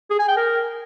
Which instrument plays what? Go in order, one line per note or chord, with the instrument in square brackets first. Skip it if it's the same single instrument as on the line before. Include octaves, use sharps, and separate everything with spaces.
[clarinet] G#4
G#5
G5
A#4